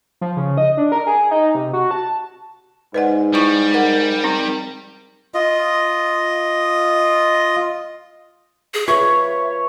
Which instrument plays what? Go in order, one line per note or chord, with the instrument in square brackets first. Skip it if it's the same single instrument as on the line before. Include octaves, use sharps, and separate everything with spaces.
[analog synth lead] F3
C#3
D#5
D4
A#4
G#4
D#4
C3
F#4
A5
[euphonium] G#2 [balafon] B4 D5 F#5
[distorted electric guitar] G3 [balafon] E4 C#6
[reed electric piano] A#4 [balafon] F#5
[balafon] C4 D#4
[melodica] F4 D#5
[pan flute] G#4
[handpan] F4 B4 [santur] C#5 [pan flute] E5